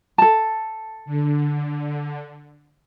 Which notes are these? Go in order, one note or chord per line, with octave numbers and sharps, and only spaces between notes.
A4 A5
D3